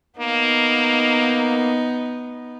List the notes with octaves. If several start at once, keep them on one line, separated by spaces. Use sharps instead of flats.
A#3 B3 D#4